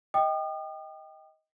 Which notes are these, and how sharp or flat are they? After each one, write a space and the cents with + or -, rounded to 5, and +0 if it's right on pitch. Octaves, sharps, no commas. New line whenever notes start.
D#5 +20 G5 +0 D#6 -40